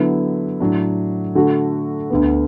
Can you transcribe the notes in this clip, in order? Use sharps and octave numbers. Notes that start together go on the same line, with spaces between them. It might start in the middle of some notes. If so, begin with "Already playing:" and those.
Already playing: D3 F#3 B3 E4
A2 F#3 D4
D3 A3 F#4
D2 D3 B3